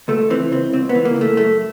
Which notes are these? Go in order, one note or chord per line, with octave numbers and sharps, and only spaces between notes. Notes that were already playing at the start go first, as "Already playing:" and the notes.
C#2 A3
E3 C4
C#2 C4
C#2 C4
B3
E3
A#3
C#2
A3
F#2 A3